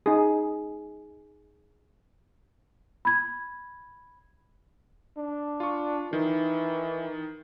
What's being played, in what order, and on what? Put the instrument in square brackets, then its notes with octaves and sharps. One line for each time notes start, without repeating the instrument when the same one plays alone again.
[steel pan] D#4 G#4
[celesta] B5 G#6
[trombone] D4
[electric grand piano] F4 C#6
[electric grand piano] D#3 [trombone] E3